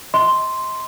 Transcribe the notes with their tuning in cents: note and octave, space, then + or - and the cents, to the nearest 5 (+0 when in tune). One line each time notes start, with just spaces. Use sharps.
D#5 +30 C6 +0